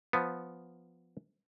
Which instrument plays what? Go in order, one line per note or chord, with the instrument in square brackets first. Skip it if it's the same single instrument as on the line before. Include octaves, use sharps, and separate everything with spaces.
[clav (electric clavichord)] F3 B3